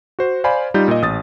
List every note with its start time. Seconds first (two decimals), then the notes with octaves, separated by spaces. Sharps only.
0.19 F#4 C5
0.44 C5 D5 F5 G#5 B5
0.74 G3 D#4 F4 G6
0.88 A#2 D#5
1.02 A1 D#6 A6